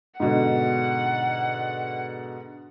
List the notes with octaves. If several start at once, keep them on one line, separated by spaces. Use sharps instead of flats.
G#2 B2 D3 F#5